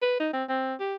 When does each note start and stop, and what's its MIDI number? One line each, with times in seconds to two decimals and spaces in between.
0.02 0.17 71
0.20 0.30 63
0.33 0.44 60
0.49 0.74 60
0.80 0.95 67